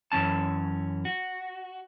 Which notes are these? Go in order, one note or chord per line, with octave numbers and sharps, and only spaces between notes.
F#2 E3 C#4 A5
F#4